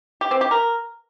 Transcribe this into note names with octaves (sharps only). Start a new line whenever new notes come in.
G4
C4
G4
A#4